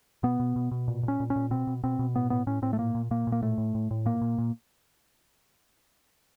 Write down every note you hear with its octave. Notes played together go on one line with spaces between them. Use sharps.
B2 B3
B2
B2
B2
A#2
A#2
C#4
A#2
C#4
A#2
B2 C4
B2
B2 C4
B2
A2 B3
A2 B3
A2 C#4
A2 C4
A3
A#2 A#3
A#2
A#2 A#3
A#2
A#3
A2 A3
A2
A2
A2
A#2 A#3
A#2
A#2